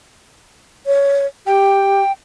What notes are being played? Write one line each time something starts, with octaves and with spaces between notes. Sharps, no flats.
C#5
G4 G5